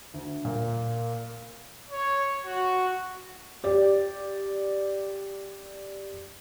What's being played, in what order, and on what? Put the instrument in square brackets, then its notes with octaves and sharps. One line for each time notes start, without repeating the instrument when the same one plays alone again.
[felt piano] D2
A#2
[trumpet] C#5
F#4
[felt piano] G4 D5